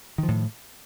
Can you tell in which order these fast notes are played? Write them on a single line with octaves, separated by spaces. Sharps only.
D#3 F3 A2